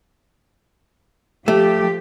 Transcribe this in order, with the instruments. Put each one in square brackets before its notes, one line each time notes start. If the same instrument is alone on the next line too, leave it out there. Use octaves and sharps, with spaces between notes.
[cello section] F3 G4 [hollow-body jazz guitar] A3